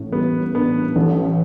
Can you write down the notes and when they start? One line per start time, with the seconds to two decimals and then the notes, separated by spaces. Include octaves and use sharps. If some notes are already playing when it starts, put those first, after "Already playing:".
Already playing: A1 A2
0.12 G3 B3
0.55 B3 D4
0.96 A1 A3